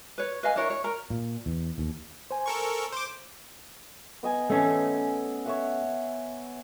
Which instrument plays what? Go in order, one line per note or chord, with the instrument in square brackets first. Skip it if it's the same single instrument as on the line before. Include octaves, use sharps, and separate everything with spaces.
[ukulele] B4 C#5
B4 D#5 F5 G#5
D4 E4 A#4 C#5
C#5
A#4 A#5
[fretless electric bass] A#2
E2
D#2
[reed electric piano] C5 G#5
[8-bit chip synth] A4 A#4 C#6
C5 D6
[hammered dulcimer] B3 D#5 G#5
[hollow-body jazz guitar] A3 C#4
[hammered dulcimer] C#5 E5 F#5